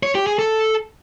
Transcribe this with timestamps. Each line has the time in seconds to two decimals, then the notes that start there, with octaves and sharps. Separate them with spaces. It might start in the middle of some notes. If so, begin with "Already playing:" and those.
0.03 C#5
0.15 G4
0.27 G#4
0.39 A4